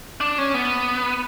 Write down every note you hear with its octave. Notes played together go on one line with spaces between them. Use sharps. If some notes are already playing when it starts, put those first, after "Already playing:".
D4
C#4
B3